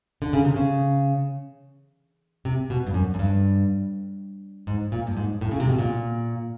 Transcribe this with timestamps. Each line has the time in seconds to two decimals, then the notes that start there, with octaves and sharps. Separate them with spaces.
0.22 D3
0.33 C#3
0.44 C3
0.56 C#3
2.45 C3
2.70 B2
2.87 G2
2.94 F#2
3.14 F#2
3.19 G2
4.67 G#2
4.92 A#2
5.07 G2
5.17 G#2
5.41 A2
5.51 C#3
5.60 C3
5.69 B2
5.79 A#2